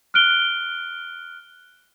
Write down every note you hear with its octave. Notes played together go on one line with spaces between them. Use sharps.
F6 F#6 D7 G7